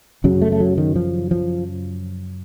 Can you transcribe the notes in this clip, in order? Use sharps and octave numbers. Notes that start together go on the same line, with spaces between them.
F#2 C#3 F#3
A3
A3
F#3
D#3
F3
F3